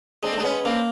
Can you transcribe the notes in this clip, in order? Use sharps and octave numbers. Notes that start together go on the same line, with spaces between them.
G#3 C4 D4
A3
D4
G#3 B3 C#4
A#3 C4 D4